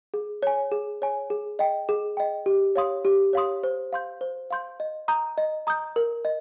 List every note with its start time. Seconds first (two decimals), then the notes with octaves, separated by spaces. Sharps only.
0.14 G#4
0.43 C#5 G#5
0.72 G#4
1.02 C#5 G#5
1.30 G#4
1.59 D#5 G5
1.89 G#4
2.17 D#5 G5
2.46 G4
2.76 C#5 F5 C6 D#6
3.05 G4
3.33 C#5 F5 C6 D#6
3.63 C5
3.93 F5 C6 G6
4.21 C5
4.51 F5 C6 G6
4.80 D#5
5.08 A#5 D#6 G6
5.38 D#5
5.67 A#5 D#6 G6
5.96 A#4
6.25 D#5